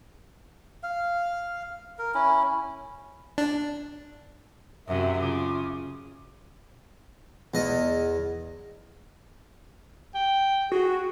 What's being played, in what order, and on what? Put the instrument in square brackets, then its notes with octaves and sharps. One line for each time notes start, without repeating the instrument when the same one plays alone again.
[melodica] F5
A#4
C#4 E4
[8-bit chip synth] D4
[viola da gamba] F#2 C3 [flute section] E5
[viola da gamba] C#3 [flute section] F4 D6
[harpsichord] E2 D#5
[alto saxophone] G5
[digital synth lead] F#4 [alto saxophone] G#4